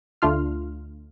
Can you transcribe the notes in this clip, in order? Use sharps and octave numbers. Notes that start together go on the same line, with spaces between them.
D2 A3 D4 F4 C6 F6